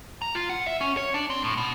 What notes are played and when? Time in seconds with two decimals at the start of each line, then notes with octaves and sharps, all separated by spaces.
0.22 A#5
0.35 F4
0.49 F#5
0.66 E5
0.81 C#4
0.97 C#5
1.14 D4
1.30 C4
1.44 A2
1.57 B2